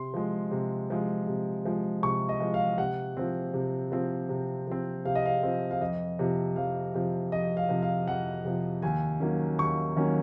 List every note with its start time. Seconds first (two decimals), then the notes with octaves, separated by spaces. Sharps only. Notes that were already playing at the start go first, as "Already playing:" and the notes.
Already playing: C3 C6
0.14 F3 G#3
0.51 C3
0.90 F3 G#3
1.27 C3
1.65 F3 G#3
2.03 C3 C#6
2.29 D#5
2.40 F3 G#3
2.54 F5
2.78 C3 F#5
3.17 F3 C4
3.54 C3
3.92 F3 C4
4.29 C3
4.68 F3 C4
5.05 C3 F5
5.15 D#5
5.25 F5
5.43 F3 C4
5.71 F5
5.81 F2 D#5
6.19 C3 F3
6.56 F2 F5
6.94 C3 F3
7.32 F2 D#5
7.57 F5
7.69 C3 F3
7.82 F5
8.08 F2 F#5
8.45 C3 F3
8.82 D#2 G#5
9.20 D#3 F#3 A#3 C#4
9.59 D#2 C#6
9.96 D#3 F#3 A#3 C#4